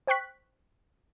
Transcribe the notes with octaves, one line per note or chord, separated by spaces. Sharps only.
C5 G5 C#6 F#6 B6